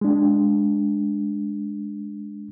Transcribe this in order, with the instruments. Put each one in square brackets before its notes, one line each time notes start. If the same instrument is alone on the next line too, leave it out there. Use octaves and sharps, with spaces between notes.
[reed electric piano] G#3 D4